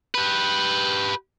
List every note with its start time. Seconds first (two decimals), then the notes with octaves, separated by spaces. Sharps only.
0.15 G4 B4